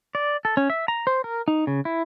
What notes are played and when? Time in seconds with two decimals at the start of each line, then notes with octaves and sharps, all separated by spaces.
0.15 D5
0.45 A4
0.57 C#4
0.70 E5
0.88 A#5
1.07 C5
1.24 A#4
1.48 D#4
1.67 C#3
1.85 E4